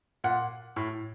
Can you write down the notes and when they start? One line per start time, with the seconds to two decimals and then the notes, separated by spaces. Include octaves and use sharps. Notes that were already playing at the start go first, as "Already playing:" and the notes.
0.24 A#2 F#5
0.76 A2